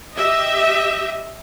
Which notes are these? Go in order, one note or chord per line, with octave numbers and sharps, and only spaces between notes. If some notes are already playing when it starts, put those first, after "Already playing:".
G4 D#5 E5